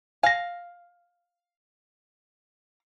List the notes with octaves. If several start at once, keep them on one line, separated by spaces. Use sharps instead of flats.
F5 G#5 A#6